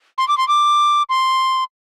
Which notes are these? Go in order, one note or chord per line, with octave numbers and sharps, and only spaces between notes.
C6
D6
C6
D6
C6